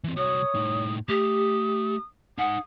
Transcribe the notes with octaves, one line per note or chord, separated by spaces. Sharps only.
E3 C4
C2 F#4 C#5 D#6
A2 D#4
A3 G4 D#6
D#4 F#5 G#5 D#6